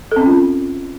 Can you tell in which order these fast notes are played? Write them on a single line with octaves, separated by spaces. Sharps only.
A4 C4 C#4 F4